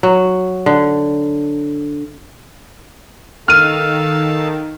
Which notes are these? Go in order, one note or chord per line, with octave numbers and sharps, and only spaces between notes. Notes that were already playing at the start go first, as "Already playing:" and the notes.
F#3
D3
D#3 A4 F5 A5 F6 D#7